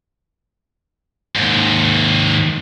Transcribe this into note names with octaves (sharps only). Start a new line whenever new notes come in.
D#2 G#2